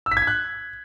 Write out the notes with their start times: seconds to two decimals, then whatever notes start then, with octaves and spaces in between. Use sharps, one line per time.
0.06 E6
0.11 B6
0.17 G#6
0.22 B6
0.27 F#6